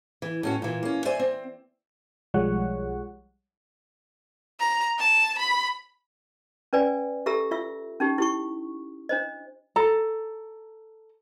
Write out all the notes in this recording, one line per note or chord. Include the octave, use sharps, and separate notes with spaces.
E3
A2 C#4 F#4
A#2 E3
A#3 C#4
C5 D5 E5 G#5
C4
B1 F3 G3 G#3 C#5 F#5
A#5
A5
B5
C#4 B4 D5 G#5
G4 A4 E5 A#5 E6
F4 E5 E6
C#4 D#4 G4
E4 G4 C#6
D4 C5 D#5
A4 A#5